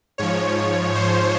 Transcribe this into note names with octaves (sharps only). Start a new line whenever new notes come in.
G#2 F3 C#5
C5